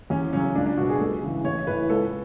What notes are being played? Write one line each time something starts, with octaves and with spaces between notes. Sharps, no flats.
E2 C#4
C#3 F#3 C#4
C#2 D4
D4
B2 F#3 F#4
G#4
C#2 A4
C#3 E3
A1 C#5
A2 E3 B4
C#2 A4